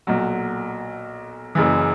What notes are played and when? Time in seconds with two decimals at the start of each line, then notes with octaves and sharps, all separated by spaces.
0.07 B1 A#2 F#3
1.55 F#1 F#2 C#3 E3